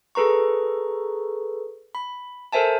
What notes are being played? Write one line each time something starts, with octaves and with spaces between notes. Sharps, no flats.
G#4 A4 B4 A#5 C#6
B5
A4 A#4 C5 E5 G#5 A5